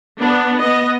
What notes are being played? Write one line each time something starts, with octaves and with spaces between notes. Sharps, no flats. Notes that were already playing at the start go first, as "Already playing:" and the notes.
B3 D4
B3 D#5